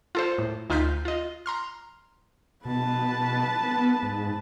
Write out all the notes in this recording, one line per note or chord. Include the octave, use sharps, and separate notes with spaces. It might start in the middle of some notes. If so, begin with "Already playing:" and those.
F4 A4 C5
A2
D2 D#4 F4 F6 G6 B6
F4 D#5
A#5 C6 F6
B2 B4 A5
B3
G#2